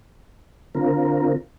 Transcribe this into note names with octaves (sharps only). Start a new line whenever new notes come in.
D3 C4 F4 A#4